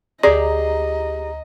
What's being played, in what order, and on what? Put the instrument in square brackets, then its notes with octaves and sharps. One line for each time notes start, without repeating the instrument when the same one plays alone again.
[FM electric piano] D2 A#5 [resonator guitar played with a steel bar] G4 G#4 [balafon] D5 [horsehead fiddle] D#5